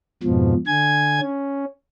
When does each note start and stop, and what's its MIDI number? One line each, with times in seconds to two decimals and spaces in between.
0.23 0.54 41
0.23 0.54 44
0.23 0.54 47
0.23 0.54 53
0.67 1.20 50
0.67 1.20 80
0.67 1.20 92
1.21 1.65 61